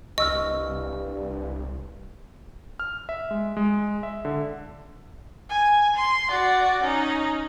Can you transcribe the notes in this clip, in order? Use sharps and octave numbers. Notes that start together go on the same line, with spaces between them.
C2 G2 D#5 C#6 E6 F6
F6
E5
G#3
G#3
E5
D3
G#5
C6
F#4 D5
C#4 D#4